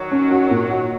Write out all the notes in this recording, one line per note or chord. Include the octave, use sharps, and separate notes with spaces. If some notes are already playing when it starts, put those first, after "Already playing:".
Already playing: D#3 F#3
C#4
F#4
A#2
F#4